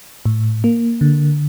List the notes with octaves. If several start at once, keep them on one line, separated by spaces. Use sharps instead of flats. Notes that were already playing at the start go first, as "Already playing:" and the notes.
A2
A#3
D3